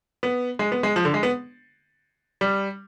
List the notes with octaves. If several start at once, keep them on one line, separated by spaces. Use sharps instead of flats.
B3
G#3
B3
G#3
F3
D3
G#3
B3
G3